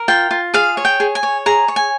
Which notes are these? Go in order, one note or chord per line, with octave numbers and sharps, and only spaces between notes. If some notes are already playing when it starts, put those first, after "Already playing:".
Already playing: A#4
F4 G5
F4
G#4 F5
C#5
G5
G#4
G#5
C#5
G#4 A#5
C#5
G#5